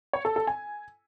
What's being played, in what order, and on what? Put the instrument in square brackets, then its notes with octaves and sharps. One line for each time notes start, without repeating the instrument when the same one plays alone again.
[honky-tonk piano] C#5
A4
A4
G#5